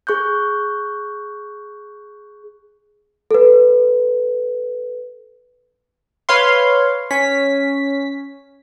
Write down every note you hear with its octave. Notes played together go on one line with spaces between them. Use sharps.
G#4 C#6 F#6 G6
A4 B4
B4 C#5 F5 C6
C#4 B6